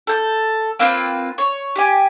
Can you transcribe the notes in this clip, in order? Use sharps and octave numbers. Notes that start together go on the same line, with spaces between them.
A4 G6
A#3 C4 F4 B4
C#5
G4 G#5